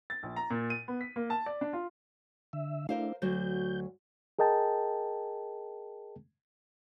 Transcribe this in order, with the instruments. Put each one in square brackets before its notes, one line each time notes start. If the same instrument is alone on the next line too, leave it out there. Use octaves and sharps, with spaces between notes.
[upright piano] A6
A#1
A#5
A#2
D#7
B3
B6
A#3
A5
D5
D4
F4
[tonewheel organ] D3 E5
[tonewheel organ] A3 D4 E4 [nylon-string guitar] A#4 C5 F5
[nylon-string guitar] D2 F#3 F#4 [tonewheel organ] G6
[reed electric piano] G#4 A#4 D#5 G5 A5